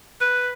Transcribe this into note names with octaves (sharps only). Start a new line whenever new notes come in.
B4